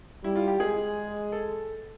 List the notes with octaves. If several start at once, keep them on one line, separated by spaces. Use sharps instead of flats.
G3 E4
F4
G4
G#3 G#4
A4